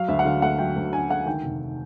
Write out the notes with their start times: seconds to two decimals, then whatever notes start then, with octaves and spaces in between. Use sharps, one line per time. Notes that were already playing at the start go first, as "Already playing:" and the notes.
Already playing: F#3 F5
0.08 D2 E5
0.19 F#5
0.25 D3 F5
0.42 A3 F#5
0.59 F#3 G5
0.76 D2
0.92 D3 G#5
1.10 A3 F#5
1.26 D#3 G5
1.44 F1